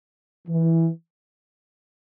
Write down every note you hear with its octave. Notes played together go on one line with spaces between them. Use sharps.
E3